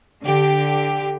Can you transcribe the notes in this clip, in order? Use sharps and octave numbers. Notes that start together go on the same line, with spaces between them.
D3 G4